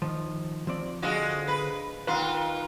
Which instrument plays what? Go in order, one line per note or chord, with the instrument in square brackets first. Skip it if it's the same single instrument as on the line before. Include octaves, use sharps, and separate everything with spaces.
[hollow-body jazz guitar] D#3 F3
F3 C4 D5
[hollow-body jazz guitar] D3 C5 D#5 [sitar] G#3 F4 F#4
[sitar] B4
[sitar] D#3 F4 [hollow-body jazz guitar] B4 F#5 C6